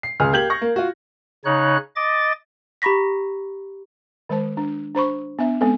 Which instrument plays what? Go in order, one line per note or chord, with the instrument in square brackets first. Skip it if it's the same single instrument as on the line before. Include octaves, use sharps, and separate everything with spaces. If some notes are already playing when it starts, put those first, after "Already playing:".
[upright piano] C7
C#2 G#4 F6
A#3 G4 G6 G#6 F#7
C#6 A#6
A#3
F4 F#4
[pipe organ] C#3 D#4 C#5 F#6
D#5 D6 A6
[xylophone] G4 A#5 B5 C#6 A#6 B6
[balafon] D#3 G#3 C5 A5
D4
D4 C5 B5 C#6
B3 D4 E5
G#3 B3 C4 A4